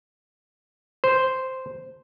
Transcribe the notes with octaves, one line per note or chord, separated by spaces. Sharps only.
C5